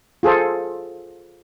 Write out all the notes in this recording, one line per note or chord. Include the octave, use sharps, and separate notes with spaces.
F4 G#4 A4 C5